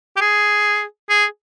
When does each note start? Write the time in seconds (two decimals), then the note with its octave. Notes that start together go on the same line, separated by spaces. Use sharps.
0.17 G4
0.21 G#4
1.10 G#4